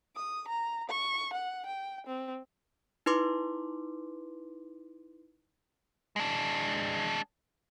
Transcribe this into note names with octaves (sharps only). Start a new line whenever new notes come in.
D#6
A#5
C#6
F#5
G5
C4
D#4 E4 B4 C6 D6
G#3 D4